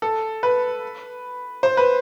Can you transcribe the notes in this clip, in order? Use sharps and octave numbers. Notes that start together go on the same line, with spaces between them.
A4
B4
C5
B4